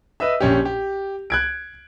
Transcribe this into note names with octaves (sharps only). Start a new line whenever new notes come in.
B4 D#5 E5 E6
A#1 C#4 G4
G4
F#6 G#6 D7